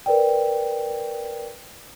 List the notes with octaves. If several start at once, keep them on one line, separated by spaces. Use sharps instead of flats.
A#4 B4 D5 G5